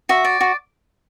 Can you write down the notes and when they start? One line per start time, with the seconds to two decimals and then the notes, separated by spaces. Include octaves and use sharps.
0.09 F#4 E5
0.25 D5
0.41 F#4